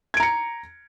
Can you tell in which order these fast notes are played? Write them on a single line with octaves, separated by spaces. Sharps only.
G#6 D7 A#5 C#7